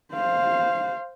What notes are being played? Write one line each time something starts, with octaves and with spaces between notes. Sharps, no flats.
C5 F5